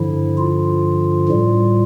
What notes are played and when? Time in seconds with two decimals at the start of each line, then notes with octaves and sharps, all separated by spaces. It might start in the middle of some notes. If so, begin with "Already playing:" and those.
Already playing: G2 D3 F3 E4
0.38 F4
1.29 A2 G3